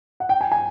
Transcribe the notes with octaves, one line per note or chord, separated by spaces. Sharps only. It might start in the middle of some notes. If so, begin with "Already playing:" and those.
F#5
G5
G#5
G#5